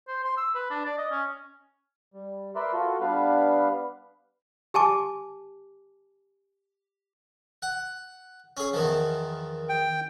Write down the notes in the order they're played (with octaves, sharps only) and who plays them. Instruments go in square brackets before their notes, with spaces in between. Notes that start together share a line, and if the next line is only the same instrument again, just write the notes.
[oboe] C5
C6
E6
B4
D4
D5
D#5
C#4
[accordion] G3
A#4 B4 D5 E5 C6
F4 F#4 A4
G3 B3 D4 B4 F5
[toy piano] G4 G#5 A5 D6
[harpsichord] F#5
C#4 G#4
E2 D#3 F3
[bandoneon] G5